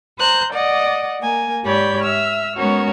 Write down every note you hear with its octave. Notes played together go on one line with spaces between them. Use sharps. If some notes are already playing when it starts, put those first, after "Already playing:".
C5 A#5 F#6 G6
D5 D#5 F#5
A#3 A#4 G#5
G#2 G4 C#5 D5 B5 G6
E5 E6 F6
G#3 B3 C#4 F#4 A#4 C#5